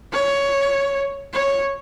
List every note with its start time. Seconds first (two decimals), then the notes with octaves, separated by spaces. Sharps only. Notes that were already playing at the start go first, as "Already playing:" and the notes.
0.12 C#5
1.33 C#5